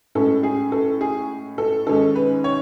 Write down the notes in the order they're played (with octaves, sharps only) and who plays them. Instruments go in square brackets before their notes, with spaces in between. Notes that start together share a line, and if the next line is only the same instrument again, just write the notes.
[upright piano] A2 G#3 C#4 A4
G#4
A4
G#4
A4
G#2 D#3 G#3 C#4 A4
B4
C#5